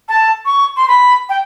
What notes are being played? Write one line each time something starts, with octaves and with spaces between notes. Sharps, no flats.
A5
C#6
C6
B5
G5